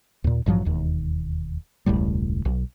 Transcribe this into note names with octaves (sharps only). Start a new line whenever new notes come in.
D#2 A#2
A1 G2 F3 F#3
E1 D#2
E1 C#2 A2 G3
B1